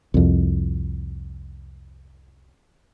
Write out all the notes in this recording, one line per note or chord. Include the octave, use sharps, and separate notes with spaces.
C2 F2